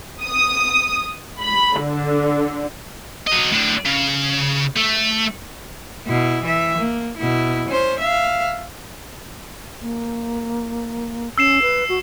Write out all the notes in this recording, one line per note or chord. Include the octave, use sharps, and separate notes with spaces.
D#6
B5
D3
F#3 D#5
A2 D4
C#3
A3
B2 E4
E3 E5
A#3
B2 E4
C#4 C5
E5 F5
A#3
C#4 E6 C7 E7
B4
F#4